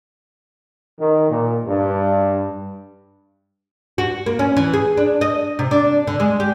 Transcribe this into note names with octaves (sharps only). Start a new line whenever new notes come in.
D#3
A#2
G2
F#4
A#3
C#4
E3
G#4
D4
D#5
C3
D4
D3
G#3
G4